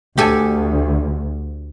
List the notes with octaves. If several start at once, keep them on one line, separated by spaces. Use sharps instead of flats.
D2 G4 A4 G#5